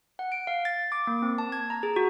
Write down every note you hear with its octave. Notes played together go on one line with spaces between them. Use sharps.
F#5
D7
F5
A6
D6
A#3
C4
A5
G#6
A#5
G#4
F#4